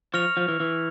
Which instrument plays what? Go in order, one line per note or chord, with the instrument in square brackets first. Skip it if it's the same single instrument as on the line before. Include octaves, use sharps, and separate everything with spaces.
[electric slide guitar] F3 [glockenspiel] C#6 F6 A#6 C#7 F7
[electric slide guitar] F3
E3
E3